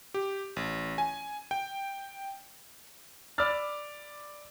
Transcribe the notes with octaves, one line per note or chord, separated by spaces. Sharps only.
G4
A1
G#5
G5
D5 B5 D6 E6 F6 A6